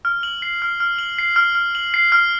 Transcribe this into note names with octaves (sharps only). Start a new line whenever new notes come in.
F6
F#7
C7
F6
F6
F#7
C7
F6
F6
F#7
C7
F6